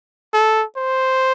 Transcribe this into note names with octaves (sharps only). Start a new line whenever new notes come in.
A4
C5